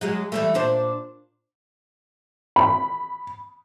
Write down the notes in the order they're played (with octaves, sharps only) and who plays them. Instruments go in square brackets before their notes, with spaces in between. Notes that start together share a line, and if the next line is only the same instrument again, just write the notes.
[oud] F#3 G#3 G#4
E3 G3 A3
A#2 D4 C5
[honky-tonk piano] B5